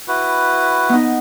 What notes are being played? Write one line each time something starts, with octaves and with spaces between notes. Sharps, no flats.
E4 F#4 B4
B3 D#4